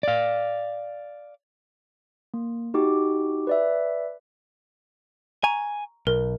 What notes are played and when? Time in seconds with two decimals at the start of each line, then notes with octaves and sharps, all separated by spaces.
0.03 D5 F5
2.34 A#3
2.74 D#4 F#4 G4 D6
3.47 B4 D5 E5
5.44 G#5 A#5 C#6 D#7
6.07 B1 A#4